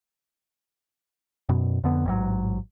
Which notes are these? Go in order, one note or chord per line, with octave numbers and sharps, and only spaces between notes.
F#2 B2
F2 D3 B3
A1 G#2 B2 F#3